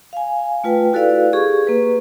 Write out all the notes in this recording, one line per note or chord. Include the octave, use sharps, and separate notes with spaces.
F5 G#5
A3 F4 B4 G5
E4 F#4 A4 B4 D5 F5
G4 G#4 C#6
A#3 B4